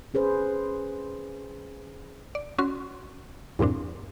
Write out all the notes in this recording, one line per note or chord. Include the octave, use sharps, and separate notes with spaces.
C#4 G#4 B4 C5
D5
C#4 F#4 C6
E2 G2 A#2 C4 D4